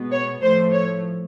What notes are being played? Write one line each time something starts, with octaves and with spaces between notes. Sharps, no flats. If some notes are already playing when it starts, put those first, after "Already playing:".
Already playing: B2 G#3 B3
C#5
A2 F3 A3 C5
C#5